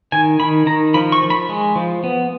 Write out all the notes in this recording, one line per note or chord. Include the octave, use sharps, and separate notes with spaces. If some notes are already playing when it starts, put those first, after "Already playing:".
D#3 G#5
D#3 B5
D#3 A#5
F3 B5
C#6
F3
B5
G#3
F3
B3